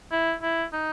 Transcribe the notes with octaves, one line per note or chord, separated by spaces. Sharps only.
E4
E4
D#4